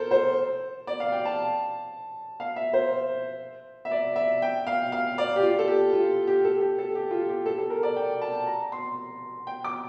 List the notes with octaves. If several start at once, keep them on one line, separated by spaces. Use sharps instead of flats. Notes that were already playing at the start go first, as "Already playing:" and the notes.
Already playing: A4 A#4 C5
C5
D5
F5
G5
A5
F5
E5
C5
E5
D5
E5
G5
F5
F5
D5
G4
F4
A4
G4
F4
G4
A4
G4
A4
G4
F4
G4
A4
A4
A#4
D5
G5
A5
A#5
C6
G5
D6